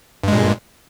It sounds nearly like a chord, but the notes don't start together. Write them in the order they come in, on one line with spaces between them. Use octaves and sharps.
G2 G#3 A#2